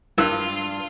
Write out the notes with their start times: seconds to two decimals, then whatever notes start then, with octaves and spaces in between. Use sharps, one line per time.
0.18 G2 E4 F4 A#4 E6